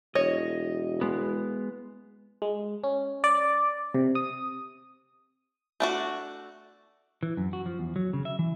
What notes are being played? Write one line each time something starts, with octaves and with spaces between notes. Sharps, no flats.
E1 C#5 D#5
G#3 B3
G#3
C#4
D5
C3
D#6
A3 D4 F#4
E3
F#2
F#4
F3
E2
F#3
C#3
E5
E3